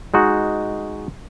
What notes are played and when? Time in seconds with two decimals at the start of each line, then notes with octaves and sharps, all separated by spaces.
0.14 G#3 D#4 F#4